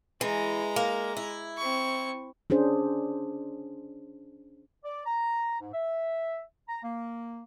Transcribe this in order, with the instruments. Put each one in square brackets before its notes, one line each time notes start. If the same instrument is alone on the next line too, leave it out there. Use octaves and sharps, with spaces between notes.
[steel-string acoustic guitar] E3 [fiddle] G#3 A#5
[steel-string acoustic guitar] A#3
E4
[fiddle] C4 C#6
[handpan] C#4 D4 G#4 C5
[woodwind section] D5
A#5
G#2
E5
A#5
A#3